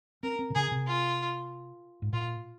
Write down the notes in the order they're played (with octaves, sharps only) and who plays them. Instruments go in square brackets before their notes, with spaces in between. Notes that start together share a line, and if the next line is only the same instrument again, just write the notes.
[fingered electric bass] C4 [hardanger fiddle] A#4
[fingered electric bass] C4
C3
[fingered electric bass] C#3 [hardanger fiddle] G#4
[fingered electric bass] C3
[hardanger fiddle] F4
[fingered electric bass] G#2
[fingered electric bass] A#2 [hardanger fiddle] F4